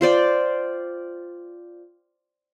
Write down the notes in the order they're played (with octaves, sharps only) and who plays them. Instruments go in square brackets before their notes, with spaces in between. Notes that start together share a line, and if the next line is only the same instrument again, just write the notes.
[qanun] F4 C5 D5 G5